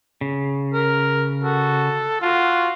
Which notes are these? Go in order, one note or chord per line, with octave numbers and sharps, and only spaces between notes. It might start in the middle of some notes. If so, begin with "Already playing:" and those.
C#3
A#4
F#4 A4
F4 F#4